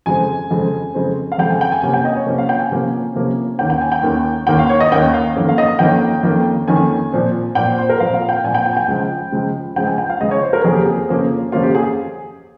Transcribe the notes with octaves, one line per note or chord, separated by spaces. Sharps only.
F2 C#3 G#3 C4 G#5
F2 C#3 G#3 C4
F2 C#3 G#3 C4
F5
F2 C#3 G#3 C4 G5
G#5
G5
G#5
C3 F3 A#3 C#4 G#5
G5
D#5
C#5
C3 F3 A#3 C#4
F5
G5
G#5
C3 F3 A#3 C#4
C3 F3 A#3 C#4
D#2 D#3 A#3 C#4 G5
G5
G#5
G5
D#2 D#3 A#3 C#4
D#2 D#3 A#3 C#4 G5
F5
C#5
D#5
D#2 D#3 A#3 C#4 G5
F5
F2 D#3 A#3 C#4
F5
D#5
F2 D#3 A#3 C#4 G5
F2 D#3 A#3 C#4
F2 D#3 A#3 C#4 G#5
A#2 F3 C4
A#2 F3 C4 G5
C5
C5
A#4
A#2 F3 C4 F5
F5
G5
A#2 F3 C4 G#5
G5
G5
G#5
G5
C#2 C#3 F3
C#2 C#3 F3
C#2 C#3 F3 G5
G#5
G5
F5
C#2 C#3 F3 D#5
C#5
C5
A#4
F2 C#3 F3 A#3 C#4 G#4
G4
G#4
F2 C#3 F3 A#3 C#4
F2 C#3 F3 A#3 C#4 F4
G4
G#4